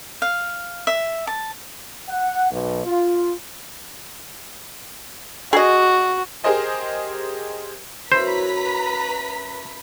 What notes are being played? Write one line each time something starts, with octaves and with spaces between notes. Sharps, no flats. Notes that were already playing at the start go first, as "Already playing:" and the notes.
F5
E5
A5
F#5
B1
F4
F#4 G#4 D#5
G4 G#4 A#4 C5 D#5 G#5
F#2 E4 B4 C5 A#5 B6